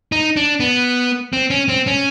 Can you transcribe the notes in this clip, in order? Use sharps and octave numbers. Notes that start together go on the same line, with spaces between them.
D#4
D4
B3
C4
C#4
C4
C#4